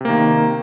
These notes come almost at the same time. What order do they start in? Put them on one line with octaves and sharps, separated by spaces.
C3 A#3 D#3